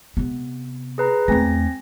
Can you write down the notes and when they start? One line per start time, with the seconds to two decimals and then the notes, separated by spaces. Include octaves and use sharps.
0.17 C3 B3
0.98 G#4 B4 A#5
1.28 E2 A3 C4 G#5 A#6